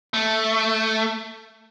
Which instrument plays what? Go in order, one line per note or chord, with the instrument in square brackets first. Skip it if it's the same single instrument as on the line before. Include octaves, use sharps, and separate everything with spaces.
[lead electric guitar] A3